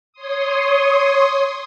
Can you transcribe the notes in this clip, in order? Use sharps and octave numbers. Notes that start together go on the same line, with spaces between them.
C#5 C6 D#6